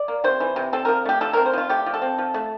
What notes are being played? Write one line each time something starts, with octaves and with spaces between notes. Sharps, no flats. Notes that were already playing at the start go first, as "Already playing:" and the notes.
Already playing: D5
A#3
C3 C5
E3
C3
C4 A4
F3 A#4
A3 G4
F3 A4
C4 A#4
C5
F3 F4
A3 G4
F3
A4
C4
F3
A3